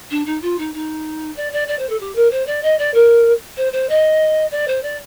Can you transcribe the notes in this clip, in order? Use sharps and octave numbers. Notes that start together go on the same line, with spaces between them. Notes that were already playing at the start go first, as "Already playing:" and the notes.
D4
D#4
F4
D#4
D#4
D5
D5
D5
C5
A4
G4
A#4
C5
D5
D#5
D5
A#4
C5
C5
D#5
D5
C5
D5